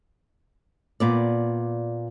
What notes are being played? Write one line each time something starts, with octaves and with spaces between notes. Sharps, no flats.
A#2 B3 D5